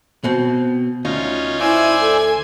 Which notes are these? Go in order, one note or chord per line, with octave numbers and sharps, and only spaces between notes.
B2 C4
D2 C#4 D#4 F4
E4 C5 D5 E5 G#5
A4